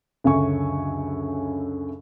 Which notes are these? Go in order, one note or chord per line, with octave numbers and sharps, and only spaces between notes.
C#2 F#2 D3 E5 G#5 C#6